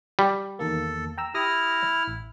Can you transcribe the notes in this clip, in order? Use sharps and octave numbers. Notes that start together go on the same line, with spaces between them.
G3
E2 D#3 A#3 A4
G5 A#5 E6
E4 G4 D#6 F6 A#6
A1